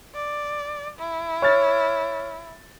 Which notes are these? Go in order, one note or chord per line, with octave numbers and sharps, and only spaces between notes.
D5
E4
C#5 F6 A6